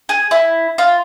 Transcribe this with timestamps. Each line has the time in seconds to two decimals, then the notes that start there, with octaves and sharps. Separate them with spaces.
0.09 G#4
0.31 E4
0.78 F4